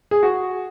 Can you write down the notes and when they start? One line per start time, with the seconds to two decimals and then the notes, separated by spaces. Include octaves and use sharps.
0.11 G#4
0.23 F#4